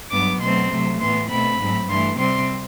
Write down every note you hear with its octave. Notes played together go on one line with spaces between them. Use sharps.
G2 F#3 B3 D6
B2 F#3 A3 C4 C6
C3 F#3 A3
A2 E3 B3 C6
B2 A3 C4 B5
A2 F#3 C4
G2 E3 A3 C6
C3 G3 C4 C6